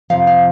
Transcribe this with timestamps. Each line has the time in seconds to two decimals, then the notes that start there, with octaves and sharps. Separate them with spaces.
0.10 F2 C3 F3 F5
0.27 F5